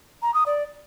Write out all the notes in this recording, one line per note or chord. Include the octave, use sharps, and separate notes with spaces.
A#5
D#6
D5